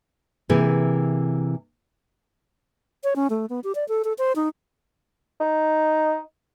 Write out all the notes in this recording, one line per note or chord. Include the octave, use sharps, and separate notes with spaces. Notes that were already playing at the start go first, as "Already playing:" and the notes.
C3 E3 A#3 G#4 B4
C#5
C#4
A3
B3
G4
D5
A4
A4
C5
D#4
D#4